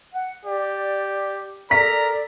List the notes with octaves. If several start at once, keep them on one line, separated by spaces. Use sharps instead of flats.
F#5
G4 D5
A4 A#4 D5 A#5 B6